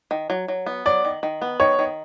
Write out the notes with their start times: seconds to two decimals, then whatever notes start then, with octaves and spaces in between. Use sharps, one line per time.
0.11 D#3
0.30 F#3
0.48 F#3
0.66 B3
0.86 F#3 D5
1.05 D#3
1.23 D#3
1.42 B3
1.60 D#3 C#5
1.79 D#3